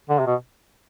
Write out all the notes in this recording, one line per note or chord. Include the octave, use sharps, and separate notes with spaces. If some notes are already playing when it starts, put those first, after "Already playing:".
D3
C3
B2